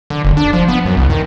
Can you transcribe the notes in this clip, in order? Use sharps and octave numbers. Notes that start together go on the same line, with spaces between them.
D3
F#1
D4
F3
B3
F#2
C2
D#3